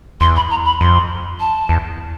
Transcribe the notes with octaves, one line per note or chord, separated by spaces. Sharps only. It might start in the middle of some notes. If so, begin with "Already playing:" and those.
E2 C6
B5
A#5
B5
F2 C6
A5
E2